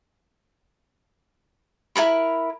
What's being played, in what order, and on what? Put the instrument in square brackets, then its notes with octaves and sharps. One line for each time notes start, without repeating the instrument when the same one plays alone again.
[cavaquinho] E4 A4 A#4 B5